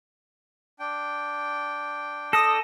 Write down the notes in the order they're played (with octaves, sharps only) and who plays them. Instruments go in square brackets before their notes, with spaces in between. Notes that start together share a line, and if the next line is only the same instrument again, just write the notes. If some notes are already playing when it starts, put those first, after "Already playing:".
[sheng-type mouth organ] D4 G5
[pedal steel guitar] A4 [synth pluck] D#6 A#6